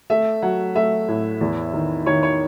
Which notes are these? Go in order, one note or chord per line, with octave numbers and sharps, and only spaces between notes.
A3 E5
F#3 F#5
A3 E5
A2
E2
D#3
D#3 C#5
C#5